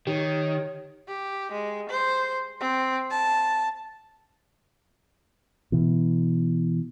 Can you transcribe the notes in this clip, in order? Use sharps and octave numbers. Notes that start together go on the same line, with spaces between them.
D#3 G4 C#5
G4
G#3
C5
C4
A5
B2 E3